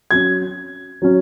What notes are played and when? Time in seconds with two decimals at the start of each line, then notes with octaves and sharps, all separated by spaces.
0.11 F#3 C#4 G#6
1.02 F#3 C#4